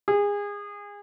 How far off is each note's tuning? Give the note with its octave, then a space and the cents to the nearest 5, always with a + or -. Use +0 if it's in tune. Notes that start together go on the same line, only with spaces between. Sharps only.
G#4 -25